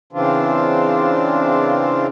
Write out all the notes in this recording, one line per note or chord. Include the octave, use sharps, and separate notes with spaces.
C#3 E3 C4 D4 F4